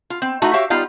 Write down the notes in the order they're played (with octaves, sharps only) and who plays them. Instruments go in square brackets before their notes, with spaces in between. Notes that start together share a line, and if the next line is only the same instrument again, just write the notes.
[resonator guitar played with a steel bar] F4
C4
A3 D#4 E4 F#4
F#4 G4 C#5 E5 F5
G3 B3 D#4 F4 D5 F5